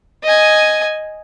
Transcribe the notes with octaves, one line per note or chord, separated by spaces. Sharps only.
D#5 G#5